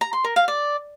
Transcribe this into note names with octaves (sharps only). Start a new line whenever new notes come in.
A#5
C6
A#4
F5
D5